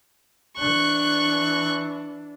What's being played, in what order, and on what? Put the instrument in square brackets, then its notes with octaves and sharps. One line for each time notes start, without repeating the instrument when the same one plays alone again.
[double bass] E3 D4 [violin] C#6 F#6